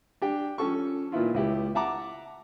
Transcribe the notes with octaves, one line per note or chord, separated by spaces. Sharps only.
D4 G4 G5
F3 C#4 A4 C#6
A#2 D#3 B3 E4 F4
C#2 E4 G4
E5 F#5 A5 A#5 D6